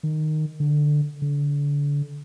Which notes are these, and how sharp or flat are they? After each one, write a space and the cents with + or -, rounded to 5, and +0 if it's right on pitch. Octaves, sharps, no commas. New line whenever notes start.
D#3 -10
D3 +10
D3 -30